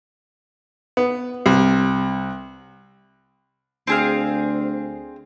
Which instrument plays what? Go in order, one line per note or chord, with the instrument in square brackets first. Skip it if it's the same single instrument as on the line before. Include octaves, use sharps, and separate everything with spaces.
[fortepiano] B3
C2
[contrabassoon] D2 [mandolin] C4 G#4 F5